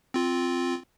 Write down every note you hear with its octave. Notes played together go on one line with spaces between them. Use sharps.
C4 F4